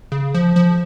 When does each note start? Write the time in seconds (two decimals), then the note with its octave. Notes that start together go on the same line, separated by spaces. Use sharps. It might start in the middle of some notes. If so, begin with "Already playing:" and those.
0.12 C#3
0.34 F3
0.56 F3